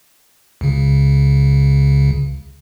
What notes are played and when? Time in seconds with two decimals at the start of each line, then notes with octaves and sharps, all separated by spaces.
0.61 C#2 C#3